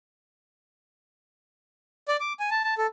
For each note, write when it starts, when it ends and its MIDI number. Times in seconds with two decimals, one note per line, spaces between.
2.08 2.17 74
2.20 2.33 86
2.40 2.49 80
2.51 2.63 81
2.64 2.74 81
2.78 2.87 69